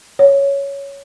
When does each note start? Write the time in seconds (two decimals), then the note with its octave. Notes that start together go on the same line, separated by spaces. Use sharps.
0.19 C#5